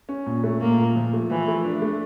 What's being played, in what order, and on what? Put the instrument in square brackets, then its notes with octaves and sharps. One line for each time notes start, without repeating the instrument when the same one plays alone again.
[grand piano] C#4
A#2
A3
[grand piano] A#2 [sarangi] A#3
[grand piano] A#2
F3
A3
[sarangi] E3 [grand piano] F3
[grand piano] A3
D4
A3